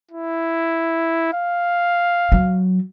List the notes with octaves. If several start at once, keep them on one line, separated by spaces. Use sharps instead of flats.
E4
F5
F#3